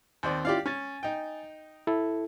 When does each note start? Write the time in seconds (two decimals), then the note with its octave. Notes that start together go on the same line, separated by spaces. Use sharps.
0.23 D#2 C4 D5
0.45 C#4 E4 F4 G4 D5 F5
0.66 C#4 G#5 A6
1.03 D#4 G5
1.87 E4 A4